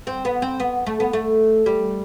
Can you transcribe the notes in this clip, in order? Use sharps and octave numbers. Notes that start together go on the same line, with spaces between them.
C4
B3
C4
B3
A3
B3
A3
G3